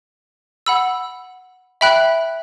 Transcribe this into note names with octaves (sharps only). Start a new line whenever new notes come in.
F#5 B5 E6
E5 G5 B5 F#6